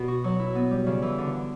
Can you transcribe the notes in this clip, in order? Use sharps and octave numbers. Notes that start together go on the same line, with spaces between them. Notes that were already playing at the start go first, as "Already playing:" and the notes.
Already playing: B2
F#4
F#3
E4
B3
G3
C#3
E3
D3
D3